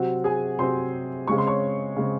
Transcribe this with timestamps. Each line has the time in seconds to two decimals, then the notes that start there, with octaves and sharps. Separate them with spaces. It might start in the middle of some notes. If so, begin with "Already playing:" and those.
Already playing: C3 F#3 C4 F#4 F#5
0.24 G#4 G#5
0.59 C3 F#3 C4 C5 C6
1.27 C#3 G#3 C4 C#6
1.38 C6
1.47 C#5 C#6
1.96 C#3 G#3 C4